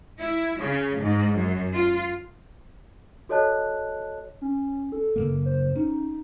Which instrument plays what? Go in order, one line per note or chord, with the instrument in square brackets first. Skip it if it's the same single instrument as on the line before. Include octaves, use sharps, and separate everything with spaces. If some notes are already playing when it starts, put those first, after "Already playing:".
[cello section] E4
C#3
G#2
F#2
F4
[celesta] F#4 A4 C#5 D#5 A5 F#6
[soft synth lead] C#4
A4
[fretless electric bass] F#1 D#2 A#3
[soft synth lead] C5
[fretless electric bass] C#4 [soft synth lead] D#4